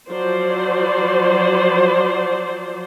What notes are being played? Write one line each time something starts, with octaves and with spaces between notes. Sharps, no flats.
F3 F#3 C5 D5